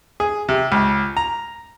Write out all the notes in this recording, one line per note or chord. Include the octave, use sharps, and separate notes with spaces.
G#4
C3
C#2
A#5